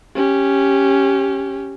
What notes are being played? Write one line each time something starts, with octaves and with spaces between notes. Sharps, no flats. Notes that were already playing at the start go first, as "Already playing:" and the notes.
C#4 G4